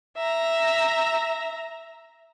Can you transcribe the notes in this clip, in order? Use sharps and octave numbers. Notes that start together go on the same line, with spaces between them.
E5 A#5